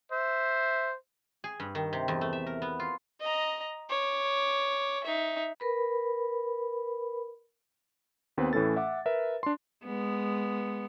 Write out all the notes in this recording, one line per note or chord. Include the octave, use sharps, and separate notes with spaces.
C5 E5
G#4
G2
D#3
C3
E2
A3
E5
A#4
B3
F4
D#5 A#5
C#5 D6
D#4 E5
A#4 B4 B5
D#2 B3 C4 B4
A2 E3 A3 C#4 A4 A6
E5 F#5 D6
A#4 B4 E5
D4 C6
G#3 B3